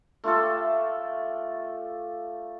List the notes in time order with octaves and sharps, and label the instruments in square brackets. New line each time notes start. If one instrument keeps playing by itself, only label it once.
[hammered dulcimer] A3 F4 G4 A4